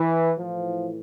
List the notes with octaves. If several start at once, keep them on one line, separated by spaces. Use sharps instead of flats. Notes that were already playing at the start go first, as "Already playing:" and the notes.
Already playing: E3
A2 E3 F3